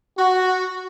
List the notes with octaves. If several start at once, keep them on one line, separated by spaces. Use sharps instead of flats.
F#4